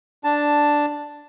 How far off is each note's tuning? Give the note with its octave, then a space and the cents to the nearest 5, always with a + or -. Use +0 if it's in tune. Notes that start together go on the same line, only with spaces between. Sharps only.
D4 +0 A5 +5